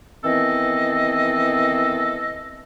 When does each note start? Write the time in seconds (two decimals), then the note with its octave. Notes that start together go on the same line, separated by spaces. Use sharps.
0.25 D#3 E3 B3 C4 A4 D#5